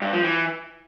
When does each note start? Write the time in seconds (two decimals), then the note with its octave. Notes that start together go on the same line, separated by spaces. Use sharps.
0.02 G2
0.13 F3
0.24 E3